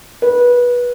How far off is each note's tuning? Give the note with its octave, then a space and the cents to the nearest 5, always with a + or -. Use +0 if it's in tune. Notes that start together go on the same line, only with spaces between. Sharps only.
B4 -20